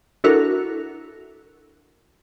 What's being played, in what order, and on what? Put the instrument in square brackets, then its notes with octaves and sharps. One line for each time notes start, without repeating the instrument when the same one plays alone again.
[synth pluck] D4 E4 F#4 A4 A#4